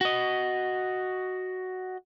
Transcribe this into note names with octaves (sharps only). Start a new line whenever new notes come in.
F#4 D#5